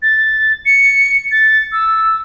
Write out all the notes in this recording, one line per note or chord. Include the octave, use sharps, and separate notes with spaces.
A6
C#7
A6
E6